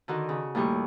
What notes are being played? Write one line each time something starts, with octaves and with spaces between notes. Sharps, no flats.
D3 D#3 F#4
C#3
D#2 A2 G3 C#6 G6